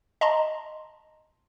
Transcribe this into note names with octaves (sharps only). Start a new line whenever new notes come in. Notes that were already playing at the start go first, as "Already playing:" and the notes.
D#5 A5 A#5 C6